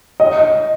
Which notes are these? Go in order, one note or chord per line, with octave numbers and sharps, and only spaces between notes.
D#5